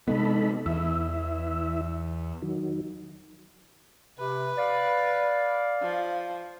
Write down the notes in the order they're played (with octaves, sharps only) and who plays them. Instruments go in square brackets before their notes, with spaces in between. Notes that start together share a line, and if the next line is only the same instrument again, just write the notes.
[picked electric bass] C3 G#3 B3 [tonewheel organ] D#4 A4 B5
[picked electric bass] E2 [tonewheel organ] E3 E5
[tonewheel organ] D#3 F#3
[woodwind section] C3 [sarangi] B4
[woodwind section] D5 F5
[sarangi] F3